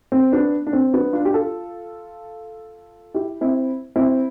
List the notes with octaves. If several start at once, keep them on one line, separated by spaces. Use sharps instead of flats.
C4
B3 D4
D4
C4
B3 D4
D4 F4
G4
F4 A4
E4 G4
C4 E4
C4 E4